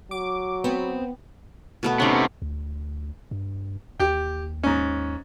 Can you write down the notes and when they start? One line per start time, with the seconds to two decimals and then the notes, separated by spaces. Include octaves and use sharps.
0.11 F#3 D6
0.64 B3 C4
1.83 B2 A3 B3
2.00 C3 B3 C#4 D#4
2.42 D2
3.31 G2
4.00 D#2 G4 G5
4.63 G#2 C#4